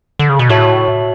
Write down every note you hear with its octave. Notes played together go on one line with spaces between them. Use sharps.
D3
C#3
B2
A2 F#4 C#5 E5 A5